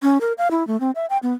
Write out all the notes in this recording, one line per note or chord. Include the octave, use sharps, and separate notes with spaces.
C#4
A#4
F5
E4
A3
C4
E5
G5
B3